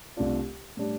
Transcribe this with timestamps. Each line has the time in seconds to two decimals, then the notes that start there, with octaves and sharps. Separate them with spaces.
0.17 C2 C3 A3 D4 F4
0.77 A2 G3 D4